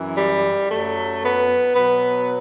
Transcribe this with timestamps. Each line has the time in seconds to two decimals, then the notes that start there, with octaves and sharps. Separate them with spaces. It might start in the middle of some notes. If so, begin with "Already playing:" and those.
Already playing: F#2 E3
0.16 G3
0.69 F#2 F#3 A3
1.22 B3
1.75 B2 F#3 B3